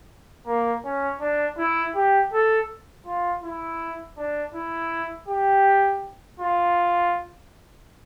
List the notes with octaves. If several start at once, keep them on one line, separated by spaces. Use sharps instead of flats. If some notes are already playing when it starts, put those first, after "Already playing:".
A#3
C#4
D4
E4
G4
A4
F4
E4
D4
E4
G4
F4